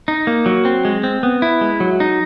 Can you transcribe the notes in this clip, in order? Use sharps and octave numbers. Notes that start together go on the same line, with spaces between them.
D#4
A#3
F#3
C4
G#3
C4
B3
E4
G#3
F#3
D#4